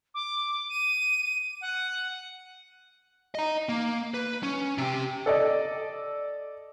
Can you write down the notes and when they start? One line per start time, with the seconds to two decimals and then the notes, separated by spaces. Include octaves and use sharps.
0.14 D6
0.69 D#7
1.61 F#5
3.35 D#5 A#5
3.69 A#3
4.14 B4
4.43 C#4
4.78 C3 G4
5.26 A4 D5 D#5